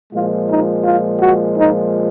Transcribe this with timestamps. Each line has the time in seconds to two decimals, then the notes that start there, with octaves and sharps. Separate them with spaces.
0.13 A#2 F3 G#3 F4
0.49 D#4
0.85 F4
1.20 F#4
1.56 D#4